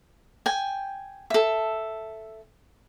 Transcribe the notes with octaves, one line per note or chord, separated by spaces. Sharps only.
G5 G#5
A4 E5